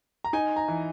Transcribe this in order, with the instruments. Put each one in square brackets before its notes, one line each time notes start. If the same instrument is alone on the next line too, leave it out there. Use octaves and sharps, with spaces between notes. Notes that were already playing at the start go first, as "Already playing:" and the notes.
[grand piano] A#5
D#4 G#5
A#5
E3